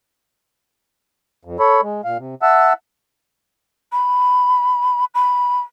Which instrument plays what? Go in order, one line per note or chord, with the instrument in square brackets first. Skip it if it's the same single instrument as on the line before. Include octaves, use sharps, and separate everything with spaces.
[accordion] F2
A4 C#5 B5
G#3
A#2 F5
C3
E5 F#5 A5 E6
[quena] B5
B5